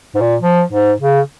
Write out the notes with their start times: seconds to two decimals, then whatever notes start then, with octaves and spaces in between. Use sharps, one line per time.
0.15 G#2
0.21 A#2
0.42 F3
0.72 G#2
1.01 C#3